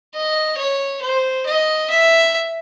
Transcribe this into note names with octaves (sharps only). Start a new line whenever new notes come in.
D#5
C#5
C5
D#5
E5